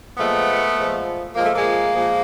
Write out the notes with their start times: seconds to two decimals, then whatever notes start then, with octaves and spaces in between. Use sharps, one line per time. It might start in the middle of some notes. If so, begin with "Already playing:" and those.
0.17 A#2 F3 G#3 A3 B3
0.76 A#2 F3 G#3
1.35 A#2 F3 G#3 A#3
1.46 A3
1.56 G#3 A#3
1.94 A#2 F3 G#3